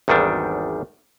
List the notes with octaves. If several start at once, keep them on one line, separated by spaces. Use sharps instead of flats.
G#1 E2 D#3 G3 D4